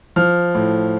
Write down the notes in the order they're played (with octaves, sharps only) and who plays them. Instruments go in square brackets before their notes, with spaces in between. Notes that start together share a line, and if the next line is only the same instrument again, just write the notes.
[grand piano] F3 F6
A2